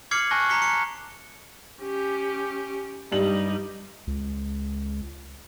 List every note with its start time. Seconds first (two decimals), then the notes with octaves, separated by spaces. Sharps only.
0.11 D6 F6 G#6 C7 C#7 F#7
0.31 G#5 A5 C#6 F#6 A#6
0.49 A#5 B6 C#7 G7
0.62 C#7
1.82 C#4 G4
3.12 G2 G3 D#4 F#7
4.07 C#2